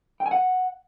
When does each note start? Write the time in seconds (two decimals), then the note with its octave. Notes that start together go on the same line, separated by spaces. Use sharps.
0.20 G5
0.26 G#5
0.31 F#5